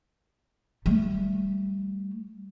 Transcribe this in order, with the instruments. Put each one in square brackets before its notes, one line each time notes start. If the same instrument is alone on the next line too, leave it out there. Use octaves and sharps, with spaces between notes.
[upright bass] G3 A3